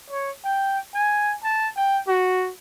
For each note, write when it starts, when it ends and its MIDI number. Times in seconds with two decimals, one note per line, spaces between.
0.10 0.31 73
0.45 0.79 79
0.95 1.36 80
1.44 1.69 81
1.76 1.99 79
2.08 2.51 66